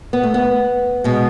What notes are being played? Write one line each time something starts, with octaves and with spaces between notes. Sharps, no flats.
B3
A3
B3
B2 G#3